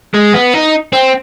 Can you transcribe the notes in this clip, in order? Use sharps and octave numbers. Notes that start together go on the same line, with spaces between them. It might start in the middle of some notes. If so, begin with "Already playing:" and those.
G#3
B3
D#4
C4